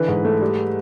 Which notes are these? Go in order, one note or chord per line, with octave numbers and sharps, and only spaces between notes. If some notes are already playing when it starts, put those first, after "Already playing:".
Already playing: D3 E3 B4
G#2
A3
G3